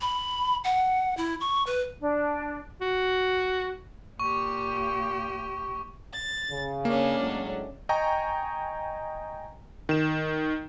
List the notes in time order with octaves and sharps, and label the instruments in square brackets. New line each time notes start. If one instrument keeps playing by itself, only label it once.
[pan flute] B5
F#5
E4
C#6
B4
[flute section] D4
[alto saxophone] F#4
[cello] A#2 G4 [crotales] C#6
[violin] A6
[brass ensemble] C#3
[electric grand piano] A#3 [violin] C#4 D4
[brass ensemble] A2 F#3 G#3
[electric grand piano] D#5 G5 G#5 A#5 C#6
D#3 E7